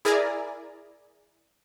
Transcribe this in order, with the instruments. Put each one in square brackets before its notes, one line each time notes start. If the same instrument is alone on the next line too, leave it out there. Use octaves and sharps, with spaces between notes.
[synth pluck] E4 G#4 A#4 D5 G#5 A#5